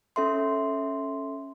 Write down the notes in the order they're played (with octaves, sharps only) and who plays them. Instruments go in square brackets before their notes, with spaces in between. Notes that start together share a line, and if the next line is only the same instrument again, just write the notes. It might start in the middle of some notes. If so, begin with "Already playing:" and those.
[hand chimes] C#4 A4 E5 C6